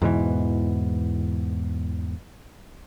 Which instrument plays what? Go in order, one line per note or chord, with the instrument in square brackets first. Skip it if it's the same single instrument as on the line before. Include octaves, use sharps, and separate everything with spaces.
[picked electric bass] E2 G#2 B2 E3